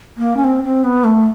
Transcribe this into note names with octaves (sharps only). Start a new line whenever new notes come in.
A#3
C#4
C4
C4
B3
A3